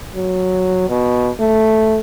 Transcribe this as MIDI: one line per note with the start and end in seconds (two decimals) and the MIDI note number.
0.16 0.84 54
0.89 1.31 47
1.41 2.00 57